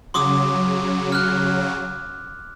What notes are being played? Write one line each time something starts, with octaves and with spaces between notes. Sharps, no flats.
C#3 F#3 C6 D6 D#6
F6 F#6